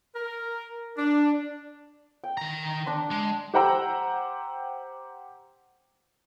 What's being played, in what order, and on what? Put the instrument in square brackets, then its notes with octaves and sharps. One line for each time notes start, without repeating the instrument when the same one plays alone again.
[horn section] A#4
D4
[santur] G5
[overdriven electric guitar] D#3 A#5
[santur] D4 D5 C6
[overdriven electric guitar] G#3
[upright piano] G4 C5 F#5 G5 A#5 E6